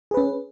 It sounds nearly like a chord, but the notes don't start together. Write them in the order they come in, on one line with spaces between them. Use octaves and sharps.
G#4 B4 C#4